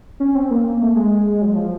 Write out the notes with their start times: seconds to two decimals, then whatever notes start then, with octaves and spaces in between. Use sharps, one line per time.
0.20 C#4
0.35 C4
0.51 A#3
0.82 A3
0.96 G#3
1.42 F#3
1.56 F3